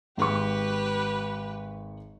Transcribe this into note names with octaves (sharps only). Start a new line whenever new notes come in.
G#1 G4 B4 C#6